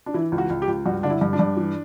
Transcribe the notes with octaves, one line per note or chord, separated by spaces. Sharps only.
D4
E3 E4
C#2
F#4
C#2
G4
C#2
G2 F#4
D3 D4
E4
G2
D4
G2
E3